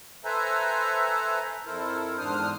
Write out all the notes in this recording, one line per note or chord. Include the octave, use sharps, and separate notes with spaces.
A4 B4 C5 E5 G#5 A#5
F2 E4 A4 A#4 C5
E2 G#2 D4 C5 D#6 F6